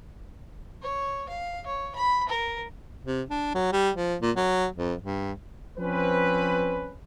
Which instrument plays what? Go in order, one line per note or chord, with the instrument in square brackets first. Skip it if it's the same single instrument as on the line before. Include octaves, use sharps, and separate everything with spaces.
[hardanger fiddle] C#5
F5
C#5
B5
A#4
[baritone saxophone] C3
D4
F#3
G3
F3
A#2
F#3
F2
G2
[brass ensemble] F3 C4 C#4 B4